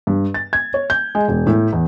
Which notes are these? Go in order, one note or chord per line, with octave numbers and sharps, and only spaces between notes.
G2
A6
G#6
C#5
G6
G#3
E1
A2
E2